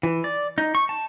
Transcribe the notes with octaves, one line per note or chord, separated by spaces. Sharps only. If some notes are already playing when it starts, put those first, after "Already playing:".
E3
D5
D#4
C#6
A5